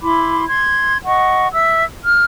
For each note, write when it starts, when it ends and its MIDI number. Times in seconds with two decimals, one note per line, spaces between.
0.02 0.45 64
0.02 0.45 83
0.02 0.45 84
0.02 0.45 86
0.48 0.97 84
0.48 0.97 92
1.06 1.47 75
1.06 1.47 78
1.06 1.47 85
1.53 1.85 76
1.53 1.85 88
2.03 2.25 89